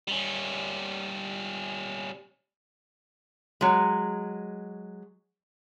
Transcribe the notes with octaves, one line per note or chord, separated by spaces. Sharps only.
G3 C#4
F#3 G#3